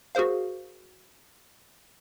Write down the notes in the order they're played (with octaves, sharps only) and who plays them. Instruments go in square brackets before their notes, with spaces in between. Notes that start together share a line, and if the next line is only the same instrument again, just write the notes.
[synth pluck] F#4 G#4 A#4 C5 F5